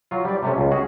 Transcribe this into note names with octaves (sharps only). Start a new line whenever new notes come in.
F#3 F4
G3 D5
C3 A3 C#4
C#2
C#4 F#4 G#4